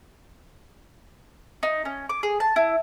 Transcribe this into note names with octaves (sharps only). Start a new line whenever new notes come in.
D#4
C#4
D6
G#4
A5
E4